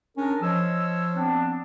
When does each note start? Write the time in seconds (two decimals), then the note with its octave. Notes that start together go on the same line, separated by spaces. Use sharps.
0.17 C#4 D4 G#4 A#4
0.42 F3 C#5 D#5 E6
1.15 B3 C4 D4